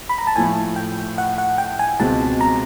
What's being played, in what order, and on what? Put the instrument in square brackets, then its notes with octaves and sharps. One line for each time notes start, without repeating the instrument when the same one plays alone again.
[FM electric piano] B5
A#5
A5
[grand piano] A2 F3 A3 [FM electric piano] G#5
[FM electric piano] G5
F#5
F#5
G5
G#5
[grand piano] C#2 B2 G#3 C4 [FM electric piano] A5
[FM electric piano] A#5